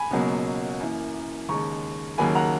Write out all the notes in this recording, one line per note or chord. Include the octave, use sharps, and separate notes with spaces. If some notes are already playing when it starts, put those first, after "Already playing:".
Already playing: G#5 B5
C#2 B2 F#3 A#3
F#2 E3 A#3
D#2 C#3 G#3 A#5 C#6
D#2 C#3 F#3 A#3 G#5 B5
F#5 A#5